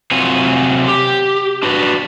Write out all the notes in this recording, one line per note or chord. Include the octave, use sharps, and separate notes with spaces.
C3 F#3 C4 F4 C#5 G#5
G4
D4 F#4 B4 D5